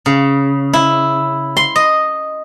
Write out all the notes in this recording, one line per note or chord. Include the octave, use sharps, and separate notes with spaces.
C#3
E4
C6
D#5